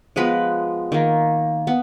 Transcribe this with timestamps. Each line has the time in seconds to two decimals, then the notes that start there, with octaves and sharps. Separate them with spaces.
0.16 F3 G#3 B3 B4
0.92 D#3 A#3
1.67 B3